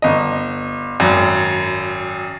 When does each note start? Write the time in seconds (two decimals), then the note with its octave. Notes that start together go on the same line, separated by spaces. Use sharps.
0.02 G1 D#5
1.00 G#1 F#2